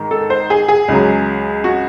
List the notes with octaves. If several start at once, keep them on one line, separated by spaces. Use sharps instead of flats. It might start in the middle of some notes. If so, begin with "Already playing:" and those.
Already playing: G#2 D#3 G#3
A4
C5
G#4
G#4
C#2 C#3 F#3
F#4